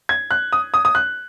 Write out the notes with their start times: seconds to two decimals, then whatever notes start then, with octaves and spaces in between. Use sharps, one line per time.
0.09 G#6
0.31 F#6
0.53 D#6
0.74 D#6
0.85 D#6
0.95 F#6